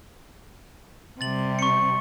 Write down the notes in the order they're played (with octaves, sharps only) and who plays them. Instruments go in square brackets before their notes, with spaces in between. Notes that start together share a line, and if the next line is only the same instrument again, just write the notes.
[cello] C3 G3 [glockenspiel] A6 F#7
[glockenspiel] C#6 C#7